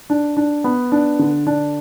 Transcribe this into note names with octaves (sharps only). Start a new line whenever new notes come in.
D4
D4
B3
D4
D3
D4